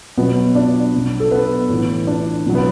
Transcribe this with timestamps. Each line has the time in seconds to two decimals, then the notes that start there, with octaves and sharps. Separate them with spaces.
0.18 B2 F#3 B3
0.55 D4 D5
0.94 B2 F#3
1.20 A4
1.31 B3 B4
1.69 A2 E3
2.07 D4
2.46 B2 F#3
2.55 B3